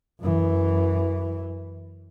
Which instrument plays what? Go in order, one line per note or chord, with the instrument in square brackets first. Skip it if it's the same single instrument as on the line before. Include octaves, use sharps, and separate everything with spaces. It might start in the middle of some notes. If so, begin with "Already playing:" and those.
[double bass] F#2 E3